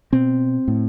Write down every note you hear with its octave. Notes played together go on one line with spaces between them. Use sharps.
B2 C4
A2